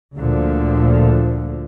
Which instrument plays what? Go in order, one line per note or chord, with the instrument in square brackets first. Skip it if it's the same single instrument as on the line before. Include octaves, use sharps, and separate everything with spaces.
[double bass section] D2 A#2 D3 F3